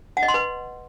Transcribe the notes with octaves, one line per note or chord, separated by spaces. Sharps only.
F#5
D#5
C6
B4